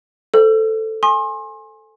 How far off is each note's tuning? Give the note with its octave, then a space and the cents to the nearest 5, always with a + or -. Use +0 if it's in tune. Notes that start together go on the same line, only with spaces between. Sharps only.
A4 +0 C5 -15 E6 +40
G#5 +0 C6 +35 D#6 -30